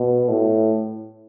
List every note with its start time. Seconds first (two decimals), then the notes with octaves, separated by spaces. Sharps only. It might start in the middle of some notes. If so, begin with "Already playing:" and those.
Already playing: B2
0.29 A2